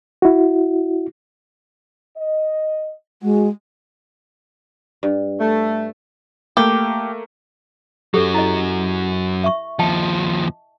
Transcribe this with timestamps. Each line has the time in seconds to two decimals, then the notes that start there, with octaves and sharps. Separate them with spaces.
0.22 E4 F#4
2.17 D#5
3.23 G#3 F#4
5.03 G2
5.40 A3
6.57 A3 A#3 G4
8.14 F#2 F#3 G4 A4 C#5
8.34 E4 D#5
9.44 E5 C#6
9.79 D#2 F3 D#5 G5 A5